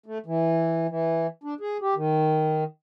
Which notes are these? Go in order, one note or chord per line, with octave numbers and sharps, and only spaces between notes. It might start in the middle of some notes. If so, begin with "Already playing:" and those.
A3
E3
E3
D4
G#4
G4
D#3